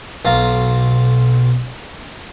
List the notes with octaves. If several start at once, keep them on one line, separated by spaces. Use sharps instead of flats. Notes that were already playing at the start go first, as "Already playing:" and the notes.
B1 F4 A#5